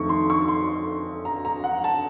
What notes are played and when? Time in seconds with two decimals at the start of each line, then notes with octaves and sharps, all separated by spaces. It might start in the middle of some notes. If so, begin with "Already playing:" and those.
Already playing: F2 D#3 A3 D#4 C#6
0.09 C6
0.30 C#6
0.48 C6
1.25 A#5
1.45 A#5
1.64 F#5
1.84 A5